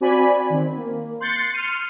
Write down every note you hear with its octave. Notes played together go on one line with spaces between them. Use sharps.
C4 F#4 D5 G#5 B5
D#3 C4
A#3
C6 F#6 G6 A6 C7 C#7
C6 F6 C#7 D#7